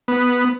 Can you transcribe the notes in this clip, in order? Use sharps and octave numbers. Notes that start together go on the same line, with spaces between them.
B3